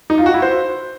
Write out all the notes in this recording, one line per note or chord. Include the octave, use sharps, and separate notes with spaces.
D#4
F4
F#4
E4
C5